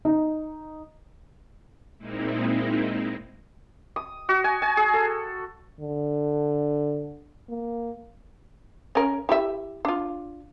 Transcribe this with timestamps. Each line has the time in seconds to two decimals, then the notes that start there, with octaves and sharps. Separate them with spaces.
0.05 D#4
1.98 A#2 G#3 A#3 C4 D#4 E4
3.96 D#6
4.29 F#4
4.44 G#5
4.62 G#5
4.77 G#4
4.94 A4
5.80 D3
7.49 A#3
8.95 C#4 A#4
9.29 E4 G4 E5
9.85 D4 F4